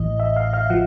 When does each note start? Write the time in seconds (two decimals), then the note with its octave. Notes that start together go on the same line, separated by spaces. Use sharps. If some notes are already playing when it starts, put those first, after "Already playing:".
Already playing: A1 A2 E3 D#5
0.20 E5
0.36 F5
0.53 F5
0.70 F3 F#5